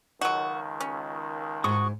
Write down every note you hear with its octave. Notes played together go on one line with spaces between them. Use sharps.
C#2 D#3 F#3 F#4
C#4
G#2 F#4 C#6 D#6